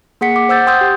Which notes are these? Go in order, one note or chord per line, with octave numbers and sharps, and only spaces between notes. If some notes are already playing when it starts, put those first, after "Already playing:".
A#3 G#4 F#5 B6 C#7
D6
C5 F#5 E6 G6 A6
G5 C6 D#6 E6 G6
G4